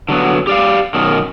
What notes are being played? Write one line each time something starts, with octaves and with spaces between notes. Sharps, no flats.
D3 F#3 B3
G4 D5 F5
F#2 B2 D#3